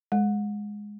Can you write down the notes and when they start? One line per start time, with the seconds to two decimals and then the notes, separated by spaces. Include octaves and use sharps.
0.12 G#3